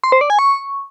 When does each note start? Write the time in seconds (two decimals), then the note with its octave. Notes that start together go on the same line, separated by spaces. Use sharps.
0.04 C6
0.12 C5
0.21 D5
0.30 G#5
0.39 C#6